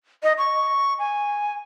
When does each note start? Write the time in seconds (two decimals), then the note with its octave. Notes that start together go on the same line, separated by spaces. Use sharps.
0.23 D#5
0.38 C#6
0.99 G#5